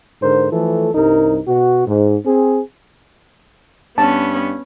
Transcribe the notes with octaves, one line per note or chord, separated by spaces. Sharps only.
G#2 D3 A#4 C5
E3 F3 A3 A4
C2 G2 D#4 A#4
B2 F#4
G#2
C4 G#4
G2 B3 C#4 A5